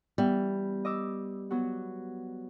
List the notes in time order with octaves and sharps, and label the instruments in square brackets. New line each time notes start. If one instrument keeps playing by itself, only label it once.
[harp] E3 B3 E5 [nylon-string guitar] G3
[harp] D#5 D6 E6
F#3 B3 F#4